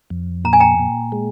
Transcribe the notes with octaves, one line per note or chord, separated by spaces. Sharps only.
F2
A#2 A#5
G#5
G5 A#5
A#2
G#3